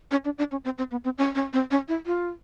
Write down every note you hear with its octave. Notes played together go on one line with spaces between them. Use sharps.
C#4
D4
D4
C#4
C4
C4
B3
C4
C#4
C#4
C4
C#4
E4
F4